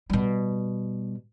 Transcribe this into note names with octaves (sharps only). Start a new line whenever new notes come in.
B2 G3